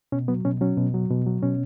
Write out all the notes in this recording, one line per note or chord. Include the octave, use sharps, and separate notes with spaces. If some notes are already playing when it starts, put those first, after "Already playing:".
B2 C#4
F#3 B3
B2 C#4
F#3 C#4
B2
F#3
B2
F#3
B2 C#4